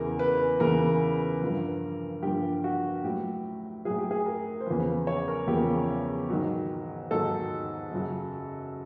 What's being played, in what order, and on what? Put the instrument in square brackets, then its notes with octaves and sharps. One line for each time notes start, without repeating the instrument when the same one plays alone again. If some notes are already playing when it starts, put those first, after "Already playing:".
Already playing: [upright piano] E2 C#3 E3 A#4
B4
E2 C#3 E3 A#4
G2 D3 F3
G2 D3 F3 G4
F#4
A2 F#3 G4
A2 F#3 G#4
G4
G#4
A#4
C5
E2 C#3 F3 B4
C#5
A#4
E2 C#3 F3 G4
G#2 D#3 F#3
G#2 D#3 F#3 A4
F#2 C#3 F#3